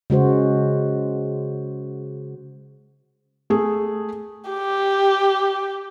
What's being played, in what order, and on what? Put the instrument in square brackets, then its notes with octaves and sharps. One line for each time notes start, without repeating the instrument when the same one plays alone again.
[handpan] C#3 G#3 F#4 C5
[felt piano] A3 G#4
[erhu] G4